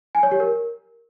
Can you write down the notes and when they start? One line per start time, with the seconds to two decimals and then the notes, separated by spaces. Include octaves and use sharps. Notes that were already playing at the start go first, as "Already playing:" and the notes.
0.15 G#5
0.23 C#5
0.32 G4
0.40 A#4